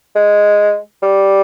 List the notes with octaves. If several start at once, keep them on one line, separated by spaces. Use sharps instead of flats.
G#3
G3